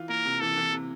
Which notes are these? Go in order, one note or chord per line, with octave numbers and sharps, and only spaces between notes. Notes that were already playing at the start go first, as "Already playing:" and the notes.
Already playing: E3 F4
A#3 A#4
C3
E3 A4
E3
C3